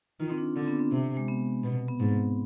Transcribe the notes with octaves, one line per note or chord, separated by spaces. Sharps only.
D#3 F4
C4
D4
D3 C4
B3
C4
C3
G#3
B3
B2
B3
G#2 C4